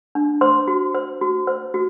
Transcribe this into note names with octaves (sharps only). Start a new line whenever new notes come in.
D4
C5 C6
F#4
C5
F#4
C5
F#4